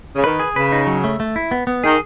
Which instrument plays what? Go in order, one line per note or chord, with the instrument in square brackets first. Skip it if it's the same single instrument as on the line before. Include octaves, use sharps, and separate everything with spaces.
[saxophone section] C#3
[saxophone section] D#3 [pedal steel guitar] B4
[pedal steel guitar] G#4
[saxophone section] C#3 [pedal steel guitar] B4
[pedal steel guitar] D#4
F#3
A3
A3
E4
B3
B3
[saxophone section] D#3 [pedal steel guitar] G#4